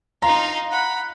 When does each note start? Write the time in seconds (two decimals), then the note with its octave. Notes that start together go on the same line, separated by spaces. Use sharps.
0.22 D#4 F4 F5 A#5
0.71 F#5 B5